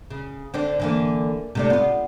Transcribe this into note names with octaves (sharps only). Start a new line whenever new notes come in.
C#3
D3 C4 D4
D3 E3 A#3
C3 A3 D4
B3 F4